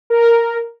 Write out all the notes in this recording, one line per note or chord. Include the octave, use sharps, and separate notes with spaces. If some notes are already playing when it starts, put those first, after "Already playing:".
A#4